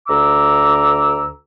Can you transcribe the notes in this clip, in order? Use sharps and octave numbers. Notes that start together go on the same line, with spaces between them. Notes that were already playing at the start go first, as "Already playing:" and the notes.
D2 A#5 D6 E6